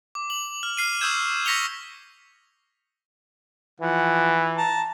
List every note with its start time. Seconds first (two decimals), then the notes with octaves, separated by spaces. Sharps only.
0.15 D6
0.30 F#7
0.63 F6
0.77 F6 C7 D#7
1.01 C#6 D#6 E6 G6 G#6 E7
1.45 C#6 A#6 B6 C#7 F7 G7
3.80 E3 F3 F#5
4.57 A5 A#5